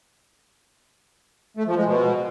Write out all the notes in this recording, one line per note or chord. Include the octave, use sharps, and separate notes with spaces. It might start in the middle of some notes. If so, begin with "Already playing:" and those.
A3
F3
G#3
B2